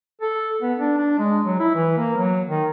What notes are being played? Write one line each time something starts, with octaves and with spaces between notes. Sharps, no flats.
A4
B3
D4
D4
G#3
F#3
E4
E3
A#3
F#3
D#3